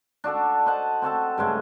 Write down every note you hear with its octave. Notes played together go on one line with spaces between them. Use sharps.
D4 F#4 A4 F#5
C5 D#5 F#5 A5
C4 F#4 A4 A5
G2 C#3 G#3 A3